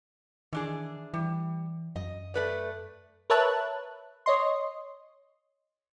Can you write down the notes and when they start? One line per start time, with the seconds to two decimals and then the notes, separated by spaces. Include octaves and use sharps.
0.53 D#3 E3 D4 G#4
1.14 E3 G3
1.96 F#2 D#5
2.34 A3 B4 D5
3.30 A#4 B4 C#5 E5 A5 F#6
4.26 C#5 D#5 C6